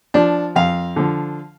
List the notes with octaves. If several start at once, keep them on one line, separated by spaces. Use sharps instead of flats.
F3 D4
F2 F5
D3 F3